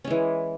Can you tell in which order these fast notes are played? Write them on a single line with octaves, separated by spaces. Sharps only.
C#4 G#3 E3